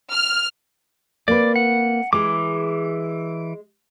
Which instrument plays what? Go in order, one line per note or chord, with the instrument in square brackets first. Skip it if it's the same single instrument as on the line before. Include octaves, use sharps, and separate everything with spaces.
[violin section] F6
[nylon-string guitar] A#3 C4 B4 [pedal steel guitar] D5
[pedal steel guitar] F#5
[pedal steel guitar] E3 D6 [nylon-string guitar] G#3 G#4